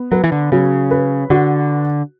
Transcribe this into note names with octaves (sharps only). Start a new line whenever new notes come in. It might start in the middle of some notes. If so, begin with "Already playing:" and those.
Already playing: B3
F#3 B4
E3
D3
C#3 F#3
B4
D3 F#4